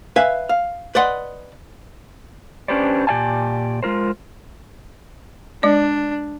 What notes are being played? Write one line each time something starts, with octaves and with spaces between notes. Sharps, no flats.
B4 E5 F5 G#5
F5
B4 D5 D#5 F#5 C6
C#4 D4 G4 B4 C5 D5
A#2 G4 D5 F5 G#5 A5
G#3 F4 A#4 C5
G#3 D4 D5